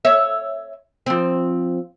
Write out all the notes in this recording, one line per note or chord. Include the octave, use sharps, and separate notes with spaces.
C#5 E5
F3 C4